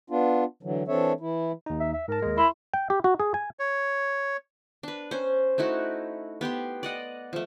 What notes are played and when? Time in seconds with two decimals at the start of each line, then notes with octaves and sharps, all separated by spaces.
0.10 B3 D4 F4
0.63 D3 E3 F#3
0.88 E3 C4 D4 A4 C#5 E5
1.20 E3 E4
1.66 D#2 D#4
1.80 E5
1.94 E5
2.08 G#2 A#4 A5
2.22 D#2 G#3
2.38 E4 C6
2.74 G5
2.90 G4
3.04 F#4
3.20 G#4
3.34 G#5
3.59 C#5
4.83 D4 B4
5.11 C#4 C5
5.58 A3 D#4 E4 F#4
6.41 B3 G4 G5 C6
6.83 D5 D#5 F#5
7.33 F3 A3